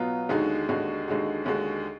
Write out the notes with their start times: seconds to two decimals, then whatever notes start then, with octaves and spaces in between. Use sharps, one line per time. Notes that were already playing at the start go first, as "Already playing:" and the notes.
Already playing: B2 F#3 B3 F4
0.29 D#2 D3 G#3 D#4 F#4
0.68 D#2 D3 G#3 D#4 F#4
1.08 D#2 D3 G#3 D#4 F#4
1.46 D#2 D3 G#3 D#4 F#4